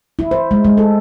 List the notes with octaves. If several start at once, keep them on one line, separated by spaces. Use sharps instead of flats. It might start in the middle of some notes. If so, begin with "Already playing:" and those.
E4
C5
G#3
G#3
A4